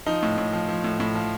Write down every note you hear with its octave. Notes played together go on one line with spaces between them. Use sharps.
F3 D#4
A2
A2
F3
F3
A2
A2
F3